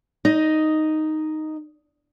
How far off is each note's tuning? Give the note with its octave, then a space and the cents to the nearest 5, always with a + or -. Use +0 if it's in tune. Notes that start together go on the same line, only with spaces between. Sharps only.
D#4 +0 D#5 +0